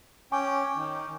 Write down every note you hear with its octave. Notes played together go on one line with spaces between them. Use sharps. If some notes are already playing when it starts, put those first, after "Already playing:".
C#4 G5 G#5 C#6 D6
D#3